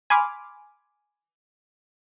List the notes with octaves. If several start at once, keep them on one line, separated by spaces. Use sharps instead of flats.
G#5 B5 C6 D6 F6